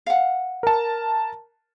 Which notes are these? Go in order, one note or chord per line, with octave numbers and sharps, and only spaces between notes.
F5 F#5
A#4 A5